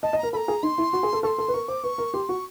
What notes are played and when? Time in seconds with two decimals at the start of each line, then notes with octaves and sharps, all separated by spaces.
0.03 D#5 A5
0.13 D#5
0.18 A#4 A#5
0.33 A4 B5
0.37 A#5
0.48 G#4
0.63 D#4 C6
0.78 E4
0.93 F#4
1.03 G#4
1.13 A4
1.23 A4 C#6
1.27 C6
1.38 A4
1.48 B4
1.54 A#4 C#6
1.68 C5 D6
1.84 B4 C#6
1.98 A#4
2.14 G4 C6
2.29 F#4 C#6